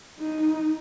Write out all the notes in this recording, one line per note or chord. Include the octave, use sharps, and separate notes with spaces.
D#4